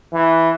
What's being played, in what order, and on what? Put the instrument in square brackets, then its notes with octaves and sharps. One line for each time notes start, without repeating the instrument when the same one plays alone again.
[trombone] E3